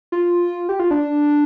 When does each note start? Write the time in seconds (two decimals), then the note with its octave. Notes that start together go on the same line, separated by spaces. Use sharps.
0.12 F4
0.69 G4
0.79 F4
0.91 D4